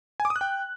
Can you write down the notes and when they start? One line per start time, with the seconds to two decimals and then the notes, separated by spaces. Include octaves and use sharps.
0.20 G#5
0.25 D6
0.30 D#6
0.36 F#6
0.41 G5